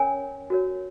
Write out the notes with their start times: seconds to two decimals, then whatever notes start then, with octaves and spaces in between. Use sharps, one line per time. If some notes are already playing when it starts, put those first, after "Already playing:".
Already playing: C#4 A#4 C#5 G#5
0.50 F#4 A#4 C#5